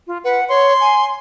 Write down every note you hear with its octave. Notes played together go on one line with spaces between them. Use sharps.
F4
B4 F#5
C#5 C6
G#5